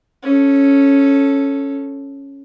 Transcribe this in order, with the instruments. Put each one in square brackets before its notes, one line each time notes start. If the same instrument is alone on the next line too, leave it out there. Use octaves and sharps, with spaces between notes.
[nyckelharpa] C#4 A4